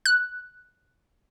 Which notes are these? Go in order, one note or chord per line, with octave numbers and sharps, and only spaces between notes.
F#6